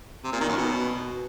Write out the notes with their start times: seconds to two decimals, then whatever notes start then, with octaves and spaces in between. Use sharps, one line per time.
0.24 C3
0.32 A#2
0.41 D#3
0.49 F#2
0.57 B2